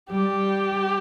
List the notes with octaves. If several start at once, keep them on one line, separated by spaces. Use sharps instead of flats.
G3 G4